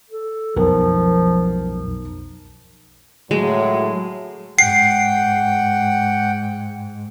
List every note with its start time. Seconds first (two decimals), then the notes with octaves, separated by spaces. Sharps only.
0.10 A4
0.56 B1 F2 F3 A#4
3.31 A2 F#3 G#3
4.59 G#2 F#5 G5 C7